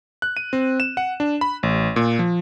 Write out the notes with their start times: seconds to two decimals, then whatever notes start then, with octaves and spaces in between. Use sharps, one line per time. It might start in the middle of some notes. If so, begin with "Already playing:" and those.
0.22 F#6
0.37 D#7
0.53 C4
0.80 E7
0.97 F#5
1.20 D4
1.41 B5
1.63 A1
1.96 A#2
2.19 F3